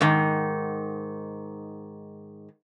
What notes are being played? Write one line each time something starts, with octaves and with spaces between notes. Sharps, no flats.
G#2 D#3